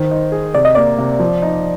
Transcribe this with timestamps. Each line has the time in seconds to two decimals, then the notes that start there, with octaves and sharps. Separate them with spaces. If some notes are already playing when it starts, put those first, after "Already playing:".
Already playing: D#3 C5
0.11 D#4
0.32 G#4
0.55 C3 D5
0.65 D#5
0.75 A#3 D5
0.98 C3
1.19 F3
1.42 D#4